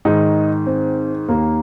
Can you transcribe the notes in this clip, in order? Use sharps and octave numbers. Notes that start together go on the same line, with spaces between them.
G#2 D#3 D#4
C4
D#2 D#3 A#3